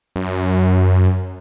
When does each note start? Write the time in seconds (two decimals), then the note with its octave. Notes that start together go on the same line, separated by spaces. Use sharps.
0.16 F#2